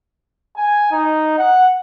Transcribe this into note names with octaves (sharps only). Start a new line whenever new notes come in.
G#5
D#4
F#5